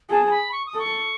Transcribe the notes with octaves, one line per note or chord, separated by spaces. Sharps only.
G#4 A5
A5
B5
C#6
D#6
A4 C#6